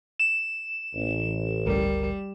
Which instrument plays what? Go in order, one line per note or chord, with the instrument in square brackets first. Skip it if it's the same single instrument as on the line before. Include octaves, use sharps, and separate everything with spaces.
[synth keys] E7
[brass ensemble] A1
[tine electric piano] G1 C#2 A#4 [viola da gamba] G3